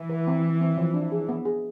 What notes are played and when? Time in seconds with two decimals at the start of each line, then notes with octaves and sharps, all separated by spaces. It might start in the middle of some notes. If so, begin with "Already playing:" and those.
Already playing: E3
0.10 B4
0.27 C4
0.43 C4
0.61 C4
0.78 F3
0.94 D4
1.12 G#4
1.29 B3
1.45 G#4